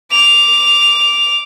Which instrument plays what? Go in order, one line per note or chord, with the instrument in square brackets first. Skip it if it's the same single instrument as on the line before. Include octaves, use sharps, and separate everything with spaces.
[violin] D6 F7